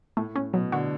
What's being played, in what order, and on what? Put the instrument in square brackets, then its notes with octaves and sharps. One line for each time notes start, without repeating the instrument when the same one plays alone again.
[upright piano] A2 [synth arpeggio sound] A3
[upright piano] A2 [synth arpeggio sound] C#4
[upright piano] B2 [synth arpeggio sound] F#3
[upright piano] D3 [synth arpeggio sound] F#4